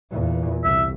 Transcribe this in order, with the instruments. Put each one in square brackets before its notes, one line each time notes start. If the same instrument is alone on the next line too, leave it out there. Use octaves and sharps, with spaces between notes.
[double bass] E2 A#2
[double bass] C2 [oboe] E5